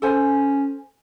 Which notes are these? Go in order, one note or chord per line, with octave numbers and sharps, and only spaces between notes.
C#4 A4 C5 G#5